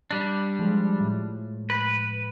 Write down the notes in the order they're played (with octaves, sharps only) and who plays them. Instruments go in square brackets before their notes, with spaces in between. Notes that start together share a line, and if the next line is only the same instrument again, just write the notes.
[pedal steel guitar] G3 D4
[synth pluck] F3 G#3
A2
[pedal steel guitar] B4